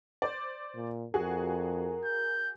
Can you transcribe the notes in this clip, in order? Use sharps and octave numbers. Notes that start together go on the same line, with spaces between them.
C5 D5
A#2
F2 F#4 G#4 A#4
G6